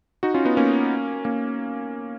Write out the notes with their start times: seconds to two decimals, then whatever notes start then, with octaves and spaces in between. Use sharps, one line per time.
0.23 D#4 F#4
0.34 C#4 F4
0.45 B3 D#4
0.57 A#3 C#4
1.25 A#3 C#4